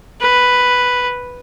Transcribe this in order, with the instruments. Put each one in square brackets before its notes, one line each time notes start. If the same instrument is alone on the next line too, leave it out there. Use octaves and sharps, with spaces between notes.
[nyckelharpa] B4